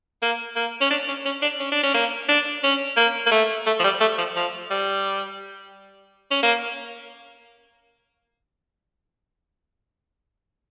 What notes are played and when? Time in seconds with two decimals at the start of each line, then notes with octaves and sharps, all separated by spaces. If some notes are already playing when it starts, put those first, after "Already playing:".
0.22 A#3
0.56 A#3
0.81 C#4
0.90 D4
1.08 C#4
1.25 C#4
1.42 D4
1.59 C#4
1.72 D4
1.83 C#4
1.94 A#3
2.29 D4
2.63 C#4
2.97 A#3
3.26 A#3
3.31 A3
3.67 A3
3.79 F3
3.84 G3
4.00 A3
4.18 F3
4.36 F3
4.70 G3
6.31 C#4
6.43 A#3